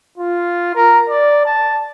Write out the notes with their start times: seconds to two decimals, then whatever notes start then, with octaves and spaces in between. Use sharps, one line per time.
0.18 F4
0.75 A#4
1.09 D5
1.46 A5